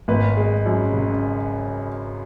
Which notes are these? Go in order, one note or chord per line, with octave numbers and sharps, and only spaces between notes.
G#1 B4
G#3
F#2
C#3